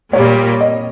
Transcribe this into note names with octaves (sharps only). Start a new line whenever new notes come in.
A#2 G3 A#3 C#5
D#5